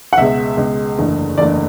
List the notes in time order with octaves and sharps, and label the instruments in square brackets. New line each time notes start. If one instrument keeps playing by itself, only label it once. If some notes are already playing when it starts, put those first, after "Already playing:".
[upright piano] F#5
C#2 B2 G#3 E5
C#2 B2 G#3
F#1 E2 D3 A3
F#1 E2 D3 A3 D5